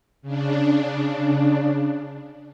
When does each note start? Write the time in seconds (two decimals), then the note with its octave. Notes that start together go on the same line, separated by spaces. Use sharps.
0.22 C#3 D4